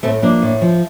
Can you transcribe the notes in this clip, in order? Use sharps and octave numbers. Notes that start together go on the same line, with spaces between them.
A2 A3 C4
F3 A#3 D4
A2
F3